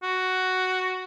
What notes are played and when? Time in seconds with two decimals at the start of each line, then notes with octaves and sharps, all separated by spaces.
0.03 F#4